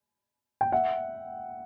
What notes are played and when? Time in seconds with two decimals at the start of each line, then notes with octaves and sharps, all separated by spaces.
0.61 G5
0.72 E5 F#5